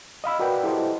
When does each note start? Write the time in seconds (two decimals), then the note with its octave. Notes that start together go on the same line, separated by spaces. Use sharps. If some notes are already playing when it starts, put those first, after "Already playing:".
0.24 D#5 F5 B5 E6
0.40 F#4 A#4 B4 D5 F#5 G5
0.64 E4 G4 A4 C5 D#5